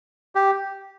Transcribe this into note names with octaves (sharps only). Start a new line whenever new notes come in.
G4